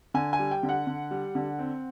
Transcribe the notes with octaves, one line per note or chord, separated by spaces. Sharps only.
D3 G#5
G#5
G3
G5
D3
F#5
D3
G3
D3
C4